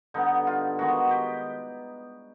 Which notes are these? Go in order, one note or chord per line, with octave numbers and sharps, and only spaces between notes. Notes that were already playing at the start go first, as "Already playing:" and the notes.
D3 G3 B3 D#4
F4
D#3 G#3 B3 F#4
G4